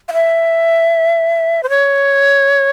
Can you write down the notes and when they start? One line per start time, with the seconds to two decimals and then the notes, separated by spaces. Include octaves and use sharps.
0.09 F5
0.13 E5
1.63 C5
1.70 C#5